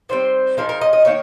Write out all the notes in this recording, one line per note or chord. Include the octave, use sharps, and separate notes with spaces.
D#3 G3 C4 C5
F3 G#3 D#4 A#4
A#4
D#5
D#5
D#3 A#3 D#4 C#5